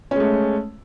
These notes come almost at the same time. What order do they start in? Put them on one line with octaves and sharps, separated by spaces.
C#4 G#3 A3